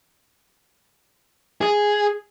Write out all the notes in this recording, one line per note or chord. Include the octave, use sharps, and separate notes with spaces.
G#4